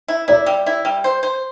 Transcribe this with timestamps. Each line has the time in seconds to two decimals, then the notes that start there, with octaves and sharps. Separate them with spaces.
0.08 E4
0.28 E4 D5
0.46 G3
0.66 E4
0.85 G3
1.04 C5
1.23 C5